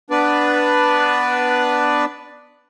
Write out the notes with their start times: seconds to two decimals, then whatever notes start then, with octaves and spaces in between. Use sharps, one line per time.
0.10 B3 D4 B4 D5